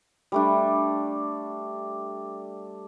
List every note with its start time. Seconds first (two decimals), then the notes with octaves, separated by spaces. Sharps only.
0.32 G3 A3 D4